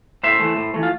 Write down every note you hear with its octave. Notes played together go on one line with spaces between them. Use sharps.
A2 C5 E5
E3 A3
A2
E3 A3
F4